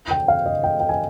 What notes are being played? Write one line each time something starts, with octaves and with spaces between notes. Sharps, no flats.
G5
F5
D#5
G5
G5
G#5